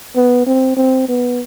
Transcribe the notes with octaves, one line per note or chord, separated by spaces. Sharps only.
B3
C4
C4
B3